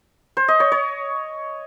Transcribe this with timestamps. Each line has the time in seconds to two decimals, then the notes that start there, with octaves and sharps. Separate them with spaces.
0.37 C5
0.48 D#5
0.60 C#5
0.72 C#5